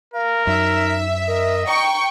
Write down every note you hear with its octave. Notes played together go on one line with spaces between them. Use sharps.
A#4 F5
F#2 D#4 E5
A#4 D#5
G5 A#5 C#6